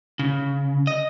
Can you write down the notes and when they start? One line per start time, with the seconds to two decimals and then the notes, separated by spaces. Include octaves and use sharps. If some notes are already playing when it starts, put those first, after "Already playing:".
0.19 C#3
0.87 D#5